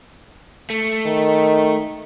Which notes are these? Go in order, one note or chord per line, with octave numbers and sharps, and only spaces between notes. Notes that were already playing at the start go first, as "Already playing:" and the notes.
A3
D#3